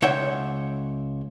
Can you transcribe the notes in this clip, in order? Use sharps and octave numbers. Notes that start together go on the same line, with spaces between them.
C#2 C#5 E5 F#5 G5